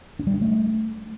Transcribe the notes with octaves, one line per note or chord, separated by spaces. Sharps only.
D4
G3
D4
A3